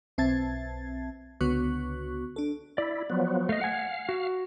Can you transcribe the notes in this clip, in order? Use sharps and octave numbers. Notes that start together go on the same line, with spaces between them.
B1 C4 E5 A5 G#6 A6
C#2 D3 B3 F#4 C#6 F#6
D4 A4
E4 D5
F3 F#3 B3
A3 D#5 F5
F#5 G#5
F#4